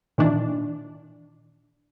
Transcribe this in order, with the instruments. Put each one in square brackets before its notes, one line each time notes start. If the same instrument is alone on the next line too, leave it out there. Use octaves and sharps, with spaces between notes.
[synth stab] A#2 D#3 E3 D4